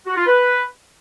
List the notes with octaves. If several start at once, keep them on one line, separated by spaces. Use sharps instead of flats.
F#4
F4
B4